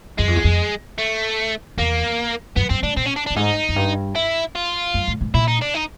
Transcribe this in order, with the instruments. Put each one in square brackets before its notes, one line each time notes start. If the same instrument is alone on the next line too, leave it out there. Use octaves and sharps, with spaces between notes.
[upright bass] F#2 [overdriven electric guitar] G#3
[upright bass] F2
E2
F2
[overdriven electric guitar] A3
[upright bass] E2 [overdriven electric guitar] A#3
[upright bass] F#2 [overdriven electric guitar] B3
[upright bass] G2 [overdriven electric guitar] C4
[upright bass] G#2 [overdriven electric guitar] D4
[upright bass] A#2 [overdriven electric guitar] C4
[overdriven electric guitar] C#4
D4
D4
[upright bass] G2
[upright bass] G#2 [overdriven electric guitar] D#4
[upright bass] F#2
G2
[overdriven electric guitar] E4
F4
[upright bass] F#2
A2
G#2
[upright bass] A#2 [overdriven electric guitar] E4
[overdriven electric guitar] D#4
D4
D#4